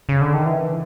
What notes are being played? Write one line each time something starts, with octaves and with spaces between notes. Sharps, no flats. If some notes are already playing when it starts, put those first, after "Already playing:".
C#3
D3
D#3
E3